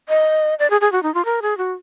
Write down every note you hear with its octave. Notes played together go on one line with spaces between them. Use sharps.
D#5
D5
G#4
G#4
F#4
D#4
F4
A#4
G#4
F#4